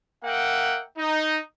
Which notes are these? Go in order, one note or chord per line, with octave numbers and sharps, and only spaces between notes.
A#3 E5 F#5 G5
D#4